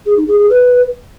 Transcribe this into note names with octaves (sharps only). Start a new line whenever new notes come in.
G#4
D#4
G#4
G#4
B4